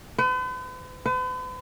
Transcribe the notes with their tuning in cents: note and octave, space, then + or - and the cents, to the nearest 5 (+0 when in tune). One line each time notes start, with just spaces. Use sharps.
B4 +45
B4 +45